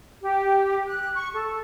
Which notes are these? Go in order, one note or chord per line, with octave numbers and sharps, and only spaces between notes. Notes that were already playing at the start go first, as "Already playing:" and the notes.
G4
F#6
C#6
A4